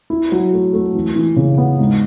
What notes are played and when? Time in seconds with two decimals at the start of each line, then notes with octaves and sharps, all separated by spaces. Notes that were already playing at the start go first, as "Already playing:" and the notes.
0.10 E4
0.32 F#3
0.53 A3
0.73 A3
0.95 E3
1.16 E3
1.36 C#3
1.58 B3
1.79 G#2